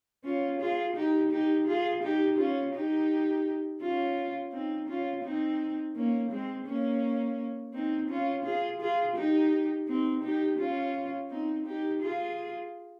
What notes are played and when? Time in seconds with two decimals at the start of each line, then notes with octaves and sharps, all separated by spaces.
0.24 C#4 F4
0.60 F4 G#4
0.96 D#4 G4
1.32 D#4 G4
1.67 F4 G#4
2.03 D#4 G4
2.38 C#4 F4
2.74 D#4 G4
3.81 C#4 F4
4.53 C4 D#4
4.88 C#4 F4
5.24 C4 D#4
5.96 A#3 C#4
6.31 G#3 C4
6.67 A#3 C#4
7.73 C4 D#4
8.10 C#4 F4
8.45 F4 G#4
8.80 F4 G#4
9.16 D#4 G4
9.88 C4 D#4
10.23 D#4 G4
10.59 C#4 F4
11.30 C4 D#4
11.66 D#4 G4
12.02 F4 G#4